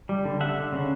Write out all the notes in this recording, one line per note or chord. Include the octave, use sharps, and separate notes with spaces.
G3
D3
D3 E5 F#5
D3
C#3